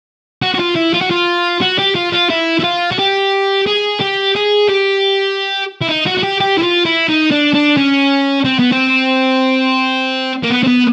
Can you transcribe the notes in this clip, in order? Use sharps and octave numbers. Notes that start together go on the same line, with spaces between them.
F#4
F#4
F4
E4
F4
F#4
F4
F#4
G4
F4
F4
E4
E4
F4
F#4
G4
G#4
G4
G#4
G4
E4
D#4
F#4
F#4
G4
G4
E4
F4
E4
D#4
D4
D4
C#4
C4
B3
C4
A#3
B3
C4
B3